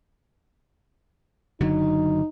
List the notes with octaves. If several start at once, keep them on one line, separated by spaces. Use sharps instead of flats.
F#1 D3 F#3 D#4